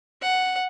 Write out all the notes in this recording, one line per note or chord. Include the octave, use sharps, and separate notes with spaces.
F#5